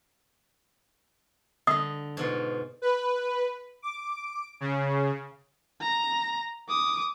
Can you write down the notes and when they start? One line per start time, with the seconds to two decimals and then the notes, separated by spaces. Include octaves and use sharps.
1.67 D3 D#5 D#6
2.17 G#2 B2 F4
2.82 B4
3.82 D6
4.61 C#3
5.81 A#5
6.69 D6 D#6